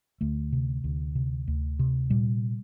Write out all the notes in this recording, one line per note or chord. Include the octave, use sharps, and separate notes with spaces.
D2 A3
C3
D2
C3
D2
C3
A#2 G3